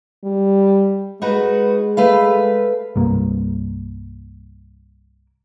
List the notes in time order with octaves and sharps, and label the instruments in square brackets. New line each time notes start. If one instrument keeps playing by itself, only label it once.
[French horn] G3
[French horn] G#3 [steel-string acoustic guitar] D#4 F#4 B4
[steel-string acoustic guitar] A3 B4 F5
[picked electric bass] C2 G2 A#3